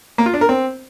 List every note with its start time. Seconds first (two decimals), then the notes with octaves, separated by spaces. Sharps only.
0.18 A#3
0.26 F4
0.34 D4
0.41 A#4
0.49 C4